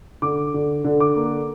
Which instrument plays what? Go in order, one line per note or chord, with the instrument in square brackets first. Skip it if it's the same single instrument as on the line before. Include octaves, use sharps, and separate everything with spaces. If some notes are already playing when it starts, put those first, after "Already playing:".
[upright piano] D3 D6
D3
D3
D6
A#3